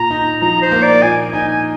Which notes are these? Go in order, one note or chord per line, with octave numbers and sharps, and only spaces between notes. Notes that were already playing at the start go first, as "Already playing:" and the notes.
Already playing: A#2 A#5
D#4
F3 A#5
C5
A#3
D5
A#2 G#5
D#4 G#5
G#5